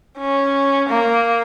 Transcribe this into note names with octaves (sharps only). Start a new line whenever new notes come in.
C#4
A#3